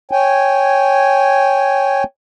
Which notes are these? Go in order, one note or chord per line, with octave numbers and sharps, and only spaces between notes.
C#5 G5 G#5